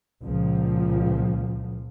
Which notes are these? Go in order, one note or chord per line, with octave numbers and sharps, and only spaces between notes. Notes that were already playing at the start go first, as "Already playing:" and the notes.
C#2 A#2 F3